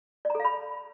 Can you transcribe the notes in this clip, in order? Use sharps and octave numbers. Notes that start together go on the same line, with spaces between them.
A4 D5 F5 A#5 B5